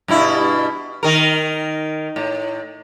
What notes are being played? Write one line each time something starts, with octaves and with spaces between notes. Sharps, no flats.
G2 B2 E4
D#3 A#4
A2